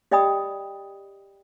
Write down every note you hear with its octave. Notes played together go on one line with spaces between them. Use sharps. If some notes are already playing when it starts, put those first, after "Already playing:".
G4 D5 D#5 G5 B5 D#6